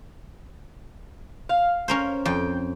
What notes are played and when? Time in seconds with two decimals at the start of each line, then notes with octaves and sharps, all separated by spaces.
1.49 F5
1.88 C#4 A#4 C5
2.25 F2 G5